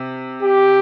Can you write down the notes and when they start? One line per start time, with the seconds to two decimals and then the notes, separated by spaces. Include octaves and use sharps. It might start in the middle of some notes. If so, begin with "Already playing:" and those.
Already playing: C3
0.43 G4